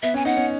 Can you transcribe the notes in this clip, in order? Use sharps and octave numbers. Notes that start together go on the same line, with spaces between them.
B3 E5
C#4 G#5
D#4 F#5
C#4